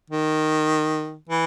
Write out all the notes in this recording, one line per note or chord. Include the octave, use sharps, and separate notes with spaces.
D#3
E3